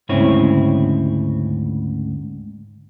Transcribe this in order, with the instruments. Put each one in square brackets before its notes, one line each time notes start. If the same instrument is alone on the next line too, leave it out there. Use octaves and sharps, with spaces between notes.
[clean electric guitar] D2 G#2 C#3 C4 E4 C#5